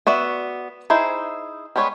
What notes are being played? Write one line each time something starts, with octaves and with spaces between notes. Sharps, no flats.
B3 F#4 D5 E5
D#4 E4 G#4 C5
G3 G#3 B3 C#5